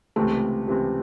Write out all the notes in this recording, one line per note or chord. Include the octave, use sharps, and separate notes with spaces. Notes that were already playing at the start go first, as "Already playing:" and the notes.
C#2 C3 E3 A3 C4
C#2 C3 E3 C4